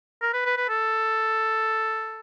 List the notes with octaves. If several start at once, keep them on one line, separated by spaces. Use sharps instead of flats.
A#4
B4
B4
B4
A4